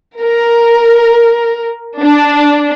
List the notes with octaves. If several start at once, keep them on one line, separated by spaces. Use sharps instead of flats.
A#4
D4